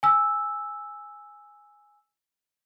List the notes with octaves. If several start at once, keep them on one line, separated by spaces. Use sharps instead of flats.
G#5 E6